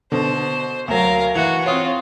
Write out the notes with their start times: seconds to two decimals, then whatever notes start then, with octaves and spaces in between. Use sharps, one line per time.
0.12 B2 D3 C5
0.88 D2 F#3 A#4 F5
1.35 E3 F#4
1.66 C4 F4 C#5 F5 D#6